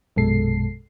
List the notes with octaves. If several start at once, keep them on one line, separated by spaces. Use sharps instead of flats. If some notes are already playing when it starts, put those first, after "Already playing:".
A#1 F#2 B2 G#3 A4 C7